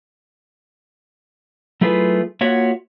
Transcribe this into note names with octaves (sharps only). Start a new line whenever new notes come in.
F#3 A3 E4 F4 G#4 B4
A#3 F4 F#4 C#5 E5 F#5